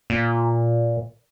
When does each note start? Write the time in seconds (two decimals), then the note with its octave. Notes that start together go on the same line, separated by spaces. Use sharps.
0.10 A#2